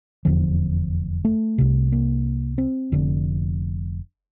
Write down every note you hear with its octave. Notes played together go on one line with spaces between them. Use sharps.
F1 E2 D3 F3
A3
C2 C3
A#3
C4
F1 F2 D3